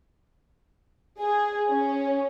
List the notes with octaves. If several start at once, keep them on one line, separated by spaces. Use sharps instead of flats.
G#4
C#4